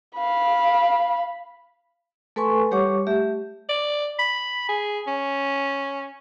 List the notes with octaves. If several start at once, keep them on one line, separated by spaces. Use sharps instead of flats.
F5 B5
A3 A4 B4 G#5 C6 C#6
G3 G4 C#5 F#5 C#6 D6
A3 G4 E5
D5
B5
G#4
C#4